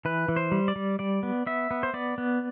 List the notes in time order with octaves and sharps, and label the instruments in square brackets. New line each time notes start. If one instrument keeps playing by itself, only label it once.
[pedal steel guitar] E3 B4
E3
C5
G3
D5
G3
G3 D5
B3
B3 E5
B3
C5
B3 D5
B3